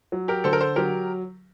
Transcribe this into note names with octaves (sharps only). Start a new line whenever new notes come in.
F#3
G4 A#4
D3 A4 C5
A#4
A4 C5
F#3 G4 A#4